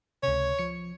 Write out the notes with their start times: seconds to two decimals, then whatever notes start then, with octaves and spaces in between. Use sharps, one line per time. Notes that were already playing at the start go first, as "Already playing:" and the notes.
0.23 C#2 C3 C#5
0.59 F3 C#7